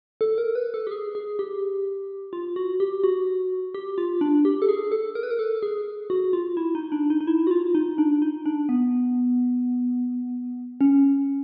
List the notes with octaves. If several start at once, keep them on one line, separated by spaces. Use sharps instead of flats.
A4
A#4
B4
A4
G4
G#4
G#4
G4
F4
F#4
G4
F#4
G4
F4
D4
G4
A4
G#4
A4
A#4
B4
A#4
A4
G#4
F#4
F4
E4
D#4
D4
D#4
D#4
E4
F#4
F4
D#4
D4
D#4
D4
B3
C#4